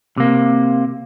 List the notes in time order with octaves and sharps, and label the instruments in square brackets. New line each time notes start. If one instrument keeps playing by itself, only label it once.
[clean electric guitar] C3 A#3